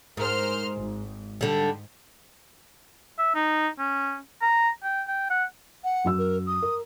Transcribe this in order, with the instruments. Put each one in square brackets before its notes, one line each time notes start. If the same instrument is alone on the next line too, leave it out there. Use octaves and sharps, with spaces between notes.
[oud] G#2 [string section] A#4 C5 F6
[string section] G#1
[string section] G#2 [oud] D3 G3
[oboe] E5
D#4
C#4
A#5
G5
G5
F#5
[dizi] F#5
[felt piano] F#2 F#4 E6
[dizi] A#4
D#6
[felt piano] A#4